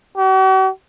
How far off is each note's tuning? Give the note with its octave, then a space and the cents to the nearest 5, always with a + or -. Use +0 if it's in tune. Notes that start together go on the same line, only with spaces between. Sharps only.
F#4 +45